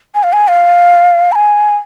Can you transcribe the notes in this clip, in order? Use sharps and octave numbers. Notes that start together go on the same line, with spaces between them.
G#5
F5
G#5
F5
B5
G#5